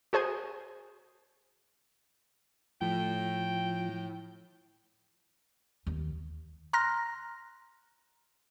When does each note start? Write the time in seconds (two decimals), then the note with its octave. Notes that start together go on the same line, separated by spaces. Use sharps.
0.13 F#4 G#4 C5 G#5
2.81 A2 F3 G5
5.86 D#2
6.73 A#5 C6 F6 F#6 A#6